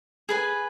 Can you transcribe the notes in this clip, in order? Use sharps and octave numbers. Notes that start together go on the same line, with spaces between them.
G#4 B4 G#5